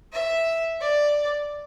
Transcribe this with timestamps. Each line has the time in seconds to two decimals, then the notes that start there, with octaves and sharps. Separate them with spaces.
0.12 E5
0.80 D5